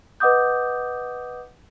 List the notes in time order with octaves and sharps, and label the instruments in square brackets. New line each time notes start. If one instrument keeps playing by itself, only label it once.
[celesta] B4 D#5 F#5 D6 D#6 G6